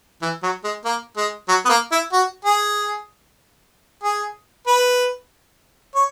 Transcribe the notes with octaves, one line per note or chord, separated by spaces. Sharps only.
E3
F#3
G#3
A#3
G#3
F#3
B3
A#3
E4
F#4
G#4
G#4
B4
C#5